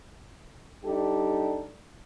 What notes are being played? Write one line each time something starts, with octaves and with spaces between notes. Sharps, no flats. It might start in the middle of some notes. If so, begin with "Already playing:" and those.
G3 D4 D#4 G4 A4